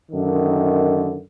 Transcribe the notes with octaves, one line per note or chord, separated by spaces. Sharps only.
F#2 D3 D#3